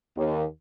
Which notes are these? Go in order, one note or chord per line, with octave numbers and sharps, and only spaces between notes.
D#2